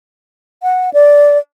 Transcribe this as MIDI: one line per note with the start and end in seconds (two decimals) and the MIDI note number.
0.63 0.90 78
0.93 1.38 74